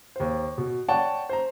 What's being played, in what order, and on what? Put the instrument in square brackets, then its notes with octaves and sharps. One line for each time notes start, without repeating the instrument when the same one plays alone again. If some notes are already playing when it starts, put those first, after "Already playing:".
[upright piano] D#2 C5
B2
C#5 D5 F#5 G5 A5 C#6
C5 A#5